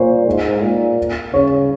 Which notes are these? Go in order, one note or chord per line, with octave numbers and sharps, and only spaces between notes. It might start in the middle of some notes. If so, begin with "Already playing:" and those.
Already playing: A#2 C5 C#5
G#2
A#2
C#3 C#5